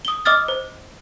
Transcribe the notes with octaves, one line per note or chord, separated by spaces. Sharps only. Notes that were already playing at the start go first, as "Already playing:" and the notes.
D#6 G7
D#5 D6 D#6 F6 A6
C5